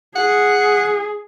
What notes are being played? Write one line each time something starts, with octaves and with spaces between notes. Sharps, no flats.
G#4 F#5